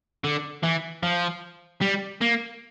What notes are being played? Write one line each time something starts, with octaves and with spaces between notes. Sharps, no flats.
D3
E3
F3
G3
A#3